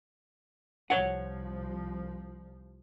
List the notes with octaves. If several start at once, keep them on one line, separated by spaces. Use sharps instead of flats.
C2 F3 C#5 F#5